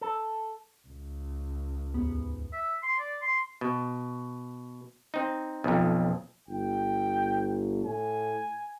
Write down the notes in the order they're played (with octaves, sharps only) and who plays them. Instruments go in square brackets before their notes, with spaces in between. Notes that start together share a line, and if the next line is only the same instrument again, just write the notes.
[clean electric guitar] A4
[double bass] C#2
[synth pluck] D#2 G#2 B3
[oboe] E5
C6
D5
C6
[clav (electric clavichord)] B2
C4 D#4
B1 F2
[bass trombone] G1 [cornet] G5
[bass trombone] A2 [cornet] G#5